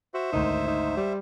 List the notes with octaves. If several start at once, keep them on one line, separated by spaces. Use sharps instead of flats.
F#4 C5 E5
G#1 D2 D#4
D#4
G3